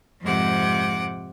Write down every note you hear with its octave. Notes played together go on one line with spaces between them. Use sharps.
F2 G#2 C3 F#5 D6